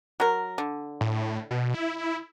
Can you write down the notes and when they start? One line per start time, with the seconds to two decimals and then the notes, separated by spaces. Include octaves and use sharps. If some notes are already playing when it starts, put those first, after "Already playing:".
0.20 F#3 A#4
0.58 D3
1.01 A2
1.51 B2
1.74 E4